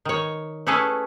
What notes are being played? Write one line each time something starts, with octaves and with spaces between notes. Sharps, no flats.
D#3 C#5
A3 C#4 E4 G#4 A4 B4